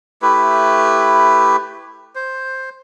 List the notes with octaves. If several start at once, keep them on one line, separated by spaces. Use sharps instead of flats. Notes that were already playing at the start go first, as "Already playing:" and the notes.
A3 E4 G4 B4
C5